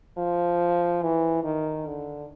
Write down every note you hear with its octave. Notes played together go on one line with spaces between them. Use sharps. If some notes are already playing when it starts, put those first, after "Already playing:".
F3
E3
D#3
D3